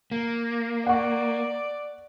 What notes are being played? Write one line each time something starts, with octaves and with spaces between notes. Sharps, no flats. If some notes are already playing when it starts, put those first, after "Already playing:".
A#3
D5 F#5 C#6